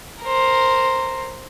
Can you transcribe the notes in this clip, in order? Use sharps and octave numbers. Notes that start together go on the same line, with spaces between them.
A#4 C5